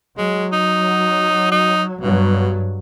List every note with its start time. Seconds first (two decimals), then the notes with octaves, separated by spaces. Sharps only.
0.18 F#3 G#3
0.52 D#4
1.52 D#4
2.01 G2 B2 F#3